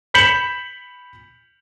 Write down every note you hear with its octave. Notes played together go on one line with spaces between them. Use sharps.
B5 G6 B6 C#7 E7 F#7